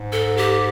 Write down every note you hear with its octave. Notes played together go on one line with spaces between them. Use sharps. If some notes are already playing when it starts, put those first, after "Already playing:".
Already playing: G#2
A4
G4